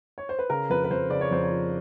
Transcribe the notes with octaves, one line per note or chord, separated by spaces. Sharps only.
C#5
C5
B4
C#3 A#4
F2 B4
B4
F2 C5
C#3 D5
C#5
F2 C5
C#5
F3